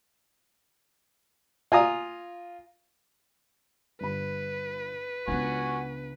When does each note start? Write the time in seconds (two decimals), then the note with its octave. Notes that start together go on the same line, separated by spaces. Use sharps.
1.72 F4 G#5 A#5 D#6
4.01 G1 G2 B4 B5
5.28 C#2 B3 D4 F#4 G#5 C#6